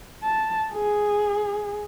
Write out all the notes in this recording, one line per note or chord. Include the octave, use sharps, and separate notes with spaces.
A5
G#4